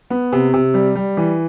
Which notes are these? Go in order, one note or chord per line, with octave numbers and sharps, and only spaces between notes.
B3
C3
C3
G3
G3
E3